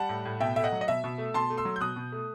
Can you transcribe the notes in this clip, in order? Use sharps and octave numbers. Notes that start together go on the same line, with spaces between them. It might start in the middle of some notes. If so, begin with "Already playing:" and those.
Already playing: G3 F#5 A5
A2
A2
B2 E5 G5
A3 E5
D#5 F#5
F#3
D#5
B2 E5
B2
A3
B2 A5 C6
A3
C6 E6
F#3
G6
B2 D#6 F#6
B2
A3